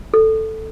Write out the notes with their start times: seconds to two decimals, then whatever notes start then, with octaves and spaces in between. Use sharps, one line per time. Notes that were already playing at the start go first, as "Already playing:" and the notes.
0.14 A4